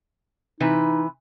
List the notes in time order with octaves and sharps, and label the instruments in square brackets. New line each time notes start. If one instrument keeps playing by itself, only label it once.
[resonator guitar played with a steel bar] C3 E3 B4 [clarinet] D#4